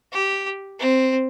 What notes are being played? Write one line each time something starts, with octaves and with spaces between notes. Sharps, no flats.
G4
C4